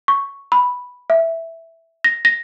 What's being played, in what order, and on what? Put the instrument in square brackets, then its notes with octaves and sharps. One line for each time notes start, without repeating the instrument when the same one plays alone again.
[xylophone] C#6
B5
E5
A#6
A#6